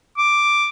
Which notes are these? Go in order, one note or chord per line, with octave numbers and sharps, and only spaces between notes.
D6